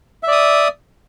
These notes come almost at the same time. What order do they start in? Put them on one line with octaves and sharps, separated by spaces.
E5 D5 D#6